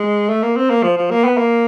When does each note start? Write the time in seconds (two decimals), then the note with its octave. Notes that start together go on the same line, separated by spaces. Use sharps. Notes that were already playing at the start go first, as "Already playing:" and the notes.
Already playing: G#3
0.29 A3
0.43 A#3
0.56 C4
0.70 A#3
0.83 F3
0.97 F3
1.11 A#3
1.25 B3
1.38 A#3